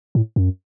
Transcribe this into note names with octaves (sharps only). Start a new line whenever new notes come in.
A2
F#2